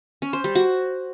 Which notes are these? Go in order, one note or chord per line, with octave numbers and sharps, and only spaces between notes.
C#4
C5
G3
F#4